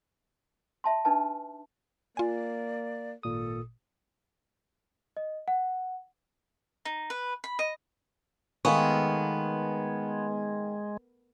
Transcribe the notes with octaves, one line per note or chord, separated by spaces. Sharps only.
E5 A5 C6
D4 D#4 B4 A5
A#3 F4 D5 G#5
G#1 A#2 A4 D#6
D#5
F#5
D#4
B4
B5
D#5
D#3 G#3 A3 B3 D#4 F5 G#5 C#6